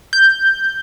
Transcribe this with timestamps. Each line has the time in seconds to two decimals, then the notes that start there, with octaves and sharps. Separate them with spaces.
0.13 G6